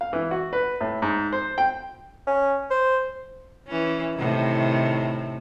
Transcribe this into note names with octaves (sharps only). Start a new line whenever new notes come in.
F5
E3
F#4
B4
A2
G#2
C5
G5
C#4
C5
E3 C#4
A2 C3 D#3